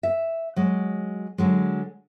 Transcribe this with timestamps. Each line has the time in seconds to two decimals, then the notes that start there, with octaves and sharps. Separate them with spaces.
0.03 E5
0.56 F#3 G#3
1.38 D3 F#3 G#3